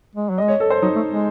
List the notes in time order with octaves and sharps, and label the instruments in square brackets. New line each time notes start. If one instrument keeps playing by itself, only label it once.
[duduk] G#3
F#3
[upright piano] D#5
[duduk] G#3
[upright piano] C#5
A4
C5
[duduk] F#3 [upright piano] D#4
[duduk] A3
G#3